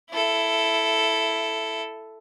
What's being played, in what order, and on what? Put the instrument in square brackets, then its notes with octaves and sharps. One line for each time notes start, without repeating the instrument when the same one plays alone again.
[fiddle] E4 A4